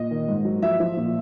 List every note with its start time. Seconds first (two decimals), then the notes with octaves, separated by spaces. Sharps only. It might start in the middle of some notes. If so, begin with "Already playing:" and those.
Already playing: A#2 D#5
0.11 D#3
0.28 G#2
0.45 F#3
0.62 F3 E5
0.80 F3
0.97 A#2